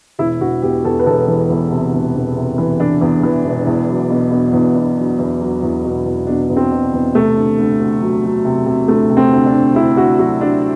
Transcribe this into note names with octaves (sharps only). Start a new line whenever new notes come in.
E1 E4
E1 F#4
E2 G4
E2 A4
B4
E1 A4
E3
E2
C3
E1
E1
C3
E3
E3 D4
E2
E3
E1
E2
F#3
B2
B2
E2
B2
F#3
E2
F#3
E2
B2
E2
B2 D4
E2
C4
B2
E2
C3 A3
D2
D2
D2
F#3
F#3
C3
C3
D2 A3
C3
C4
D2
D4
D2
D2 E4
D2 F#4
F#3 F#4
F#3 D4